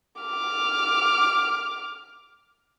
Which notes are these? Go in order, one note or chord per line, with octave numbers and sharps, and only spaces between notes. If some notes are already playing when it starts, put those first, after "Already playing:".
D6 F6